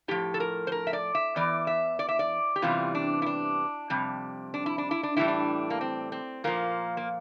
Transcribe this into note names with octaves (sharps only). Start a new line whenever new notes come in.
A2 F3 G4
A4
A#4
C5
A#4
E5
D5
E5
E2 E3 D5
E5
D5
E5
D5
G4
E2 C3 E3 G3 F4
D4
E4
D4
F2 C3 G3
D4
E4
D4
E4
D4
A2 E3 G3 E4
D4
A#3
C4
C4
A#2 F3 A#3
A#3